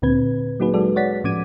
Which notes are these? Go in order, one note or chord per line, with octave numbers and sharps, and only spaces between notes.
D2 A#2 D3 C4 B4 G#6
F#3 A#3 D#4 F#4 G#4 B4
F#3 G#3 F#4 A4 D5
C#5 D5 F#5 A6 B6
A2 F3 C#4 D6 G#6 D#7